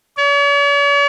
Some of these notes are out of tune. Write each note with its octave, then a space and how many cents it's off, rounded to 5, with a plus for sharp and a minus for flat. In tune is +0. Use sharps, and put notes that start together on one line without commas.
C#5 +45